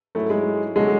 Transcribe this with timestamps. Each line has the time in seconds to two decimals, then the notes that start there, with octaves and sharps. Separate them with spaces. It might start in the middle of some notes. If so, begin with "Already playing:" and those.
0.15 G#2 F#3 A3 C#4 E4
0.30 G#3
0.76 D3 F#3 G#3 A3 C#4 F#4